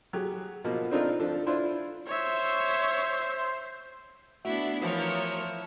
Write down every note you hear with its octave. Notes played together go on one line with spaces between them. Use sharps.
F#3 G4 G#4
B2 F3 A#3
C4 D4 D#4 F4 A4 A#4
F3 D4 A4
D4 E4 F4 C5
C5 C#5 E5
A3 B3 D4 E4 F#4 E5
E3 F3 A#4 C#5